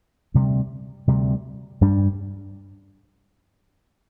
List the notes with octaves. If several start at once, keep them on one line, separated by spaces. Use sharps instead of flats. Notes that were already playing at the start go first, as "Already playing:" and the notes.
D2 C3 G3
D2 C3 G3
G2 G3 D4